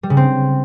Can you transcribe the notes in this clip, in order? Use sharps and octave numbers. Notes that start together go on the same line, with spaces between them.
G3
C#3
C4